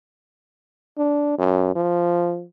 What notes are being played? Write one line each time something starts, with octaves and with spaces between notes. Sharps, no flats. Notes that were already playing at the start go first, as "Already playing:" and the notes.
D4
F#2
F3